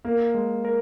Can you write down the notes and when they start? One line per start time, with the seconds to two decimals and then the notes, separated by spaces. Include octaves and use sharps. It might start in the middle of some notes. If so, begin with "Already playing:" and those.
0.04 A#3 A#4
0.34 G#3
0.65 A#4